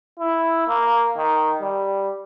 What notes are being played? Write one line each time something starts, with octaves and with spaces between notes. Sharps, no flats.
E4
A#3
D#3
G3